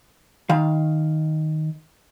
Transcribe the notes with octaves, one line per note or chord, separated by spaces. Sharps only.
D#3 F5